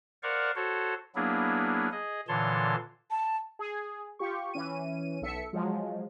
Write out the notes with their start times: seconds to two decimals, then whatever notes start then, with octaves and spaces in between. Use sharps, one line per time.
0.23 A#4 C5 D5 F5 F#5 C#6
0.56 F#4 A4 C5 C#5
1.15 F#3 A#3 B3 D4 E4 G#4
1.91 G#4 D#5
2.28 A#2 D3 E3 C#5 A5 C6
3.11 A5
3.59 G#4
4.19 F4 G4 C#6
4.54 E3 C#4 D#7
5.22 B1 A4 E5 C#7
5.53 F3 F#3 G#3